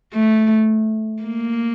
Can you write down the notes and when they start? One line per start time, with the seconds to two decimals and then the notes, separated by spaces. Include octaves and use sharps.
0.14 A3
1.23 A#3